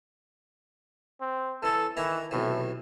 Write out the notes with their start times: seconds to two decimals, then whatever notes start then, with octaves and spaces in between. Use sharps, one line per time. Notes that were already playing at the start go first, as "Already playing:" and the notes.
1.21 C4
1.63 E3 C#4 A4
1.97 D#3 E3 E4 A#5
2.31 B1 A2 C3 E3